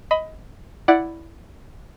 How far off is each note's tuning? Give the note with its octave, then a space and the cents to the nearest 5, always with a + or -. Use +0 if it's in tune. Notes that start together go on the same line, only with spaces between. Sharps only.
D#5 +20 B5 +15
E4 +0 D5 +0 F#5 +0